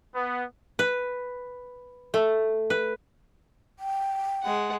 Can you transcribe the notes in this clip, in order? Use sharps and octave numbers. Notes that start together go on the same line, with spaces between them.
B3
B4
A3
B4
G5
G#3 F#5